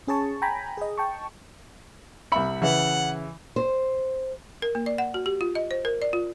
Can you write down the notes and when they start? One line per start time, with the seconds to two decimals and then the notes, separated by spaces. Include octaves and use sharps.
0.07 C#4 G#4 C#5 A5 C#6
0.42 G5 G#5 A#5 B5
0.77 G#4 D#5
0.98 G5 A5 C#6
2.32 C2 E5 B5 C#7
2.62 C#3 E3 E5 F#5
3.56 C5
4.62 A#4
4.75 A#3
4.86 D5
4.98 F#5
5.14 F#4
5.26 G4
5.41 F4
5.55 D#5
5.71 C5
5.85 A#4
6.02 D5
6.13 F4